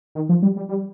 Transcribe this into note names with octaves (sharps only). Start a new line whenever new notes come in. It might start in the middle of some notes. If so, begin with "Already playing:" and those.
D#3
F3
G3
G3
G3